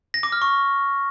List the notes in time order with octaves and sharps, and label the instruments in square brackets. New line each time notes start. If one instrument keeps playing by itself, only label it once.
[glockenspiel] A#6
D6
F6
C#6